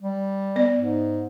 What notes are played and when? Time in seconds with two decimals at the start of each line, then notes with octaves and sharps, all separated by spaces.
0.02 G3
0.56 B3 D5
0.78 G#2